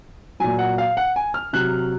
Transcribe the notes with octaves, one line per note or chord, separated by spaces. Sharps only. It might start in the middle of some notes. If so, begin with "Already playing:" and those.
A#2 F#3 G#5
F#5
F5
F#5
G#5
F6
C3 F#3 F#6